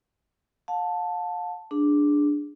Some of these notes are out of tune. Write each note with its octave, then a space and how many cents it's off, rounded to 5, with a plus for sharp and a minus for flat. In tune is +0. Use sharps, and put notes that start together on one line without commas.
F5 +40 A5 +0
D4 +0 G#4 +0